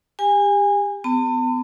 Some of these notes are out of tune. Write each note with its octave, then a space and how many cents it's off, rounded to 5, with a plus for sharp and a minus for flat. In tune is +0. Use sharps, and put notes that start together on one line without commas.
G4 +25 G#5 -25
B3 +40 A5 +45